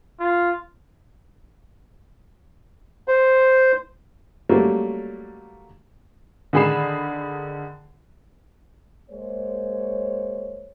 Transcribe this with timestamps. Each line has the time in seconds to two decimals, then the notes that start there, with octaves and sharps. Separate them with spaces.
0.20 F4
3.08 C5
4.49 F#3 G3 A3 A#3 C#4
6.53 D3 D#3 G#4 B5 C7 E7
9.10 G#3 A#3 C5 C#5